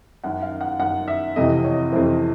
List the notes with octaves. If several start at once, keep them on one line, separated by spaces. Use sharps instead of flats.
F#2 D#3 F#5
F5
F#5
F#2 D#3 F#5
E5
F2 C3 E3 D#5
C#5
F2 C3 E3 C5